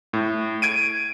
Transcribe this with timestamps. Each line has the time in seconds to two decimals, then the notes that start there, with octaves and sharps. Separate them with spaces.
0.13 A2
0.62 G#6 D7 D#7